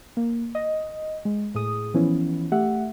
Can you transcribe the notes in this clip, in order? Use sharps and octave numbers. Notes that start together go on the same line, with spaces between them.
A#3
D#5
G#3
A2 G#4 D#6
E3 F3 B3 C#4 E4
A3 G4 E5 F#5